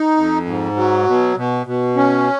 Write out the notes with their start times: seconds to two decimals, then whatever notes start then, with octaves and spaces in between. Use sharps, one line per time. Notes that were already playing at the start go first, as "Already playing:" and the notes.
Already playing: D#4
0.17 F2
0.46 G#2
0.76 F#3
1.07 B2
1.37 B2
1.66 B2
1.96 C#4